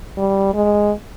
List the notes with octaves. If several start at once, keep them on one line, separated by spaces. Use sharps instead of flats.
G3
G#3